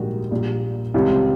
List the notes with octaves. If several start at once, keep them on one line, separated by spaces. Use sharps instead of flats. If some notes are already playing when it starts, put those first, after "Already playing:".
Already playing: A#1 G#2 D#3 G3 F#4
A#1 A#2 G3
C#2 C3 E3 G3